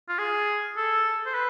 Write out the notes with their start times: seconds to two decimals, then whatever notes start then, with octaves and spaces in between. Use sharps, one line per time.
0.09 F4
0.18 G#4
0.77 A4
1.26 C5
1.35 B4